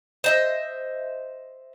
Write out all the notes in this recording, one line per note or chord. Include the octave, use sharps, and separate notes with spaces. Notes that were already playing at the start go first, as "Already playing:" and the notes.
C5 D#5 E5